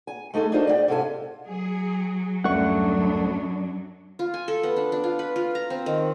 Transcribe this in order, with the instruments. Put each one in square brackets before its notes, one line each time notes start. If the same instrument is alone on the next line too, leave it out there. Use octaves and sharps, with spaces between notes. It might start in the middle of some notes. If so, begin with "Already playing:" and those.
[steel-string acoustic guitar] G#5
G#3 A3 D#4 G#4 A4
D4 D#4 F4 A#4 C5 D#5
D5 F5 G5
G#2 C3 F4 A4 C5 G#5
[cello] F#3 [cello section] G#4
[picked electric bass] D1 G3 A3 [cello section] F#2 D4 [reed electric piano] F#5 C#6
[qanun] F4
G#5
A4
B3
D4
D4
F4
B4
F4
A#5
C4
D#3